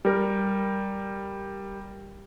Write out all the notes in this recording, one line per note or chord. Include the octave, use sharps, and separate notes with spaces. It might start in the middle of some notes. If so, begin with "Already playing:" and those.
G3 A#4